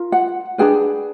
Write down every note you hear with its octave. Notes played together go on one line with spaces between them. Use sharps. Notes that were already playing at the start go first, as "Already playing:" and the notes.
Already playing: F4 A#4
F#5
D4 F4 G#4 B4 G5